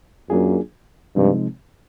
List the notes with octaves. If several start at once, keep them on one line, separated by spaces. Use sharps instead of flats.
F#2 F#3 A#3 D4 F4 G#4
G2 C3 F3 G#3 C4 D#4